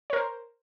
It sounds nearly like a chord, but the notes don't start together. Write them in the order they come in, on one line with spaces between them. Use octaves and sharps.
C#5 A#4 C5